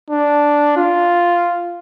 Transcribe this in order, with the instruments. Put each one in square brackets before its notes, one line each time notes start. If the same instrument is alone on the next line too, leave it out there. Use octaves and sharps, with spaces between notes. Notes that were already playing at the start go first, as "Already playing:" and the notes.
[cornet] D4
F4